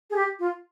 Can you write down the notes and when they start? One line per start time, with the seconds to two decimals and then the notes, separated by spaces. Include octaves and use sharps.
0.10 G#4
0.16 G4
0.39 F4